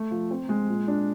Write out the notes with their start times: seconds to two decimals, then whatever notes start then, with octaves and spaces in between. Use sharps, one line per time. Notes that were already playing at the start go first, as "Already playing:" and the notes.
Already playing: A3
0.11 F3
0.31 C4
0.49 G#3
0.69 A#2
0.88 D4